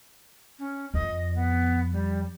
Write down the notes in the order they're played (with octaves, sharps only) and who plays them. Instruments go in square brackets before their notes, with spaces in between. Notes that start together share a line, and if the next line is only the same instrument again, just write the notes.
[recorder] C#4
[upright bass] F2 [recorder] D#5
[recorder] B3
G3